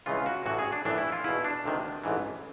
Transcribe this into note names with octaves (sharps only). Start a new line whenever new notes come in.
C#2 C#3 E3 F4
F#4
A1 A2 E3 F#4
G#4
D4
A#1 A2 E3 D4
E4
F4
E2 B2 E4
D4
D2 C3 D#3
A1 G#2 E3